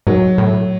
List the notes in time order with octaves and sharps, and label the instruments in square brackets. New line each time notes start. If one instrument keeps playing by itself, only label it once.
[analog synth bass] G#2 [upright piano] F#3
[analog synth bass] A2